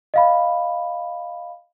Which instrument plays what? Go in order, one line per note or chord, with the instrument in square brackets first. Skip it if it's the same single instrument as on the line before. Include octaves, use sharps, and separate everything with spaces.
[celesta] D#5 F5 B5